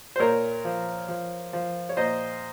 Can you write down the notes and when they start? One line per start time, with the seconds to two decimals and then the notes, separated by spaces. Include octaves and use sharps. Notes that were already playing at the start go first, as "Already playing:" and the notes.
0.16 C5
0.19 A#2 A#4 C#5
0.65 F3
1.08 F3
1.53 F3
1.89 C#5
1.97 A#2 C5 D#5